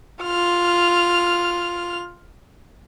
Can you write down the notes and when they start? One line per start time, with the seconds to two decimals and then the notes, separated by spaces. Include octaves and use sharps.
0.23 F4 F6